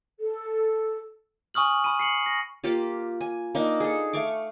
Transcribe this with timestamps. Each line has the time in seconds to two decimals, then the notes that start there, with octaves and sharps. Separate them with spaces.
0.19 A4
1.54 G#5 C#6 D#6 F6 F#7
1.84 B5 D#7
1.99 C7 C#7 F#7
2.26 A#6
2.64 A#3 F4 G4
3.21 G#5
3.55 A#3 D4 D#4
3.80 G#4 A4
4.13 A3 F5 C#6 D6